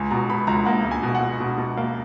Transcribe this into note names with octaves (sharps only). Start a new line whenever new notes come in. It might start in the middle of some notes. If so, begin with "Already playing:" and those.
Already playing: C#2 G#5
B2 A#5
B2 B5
C#2 A#5
A#3 F#5
C#2
G#5
B2
F#5
B2
B2
B2
A#3